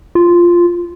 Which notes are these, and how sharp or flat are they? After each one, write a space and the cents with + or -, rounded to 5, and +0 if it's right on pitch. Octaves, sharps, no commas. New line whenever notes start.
F4 -5